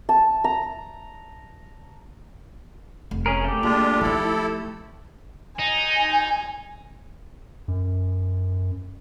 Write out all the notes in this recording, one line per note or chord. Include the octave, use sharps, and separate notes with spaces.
A5
A#5
F1
C#4 G#4 A#4
A3 G4
G#3 A#3 D4 F4
F3 D#4 E4 A4
D#4 G#5
F#2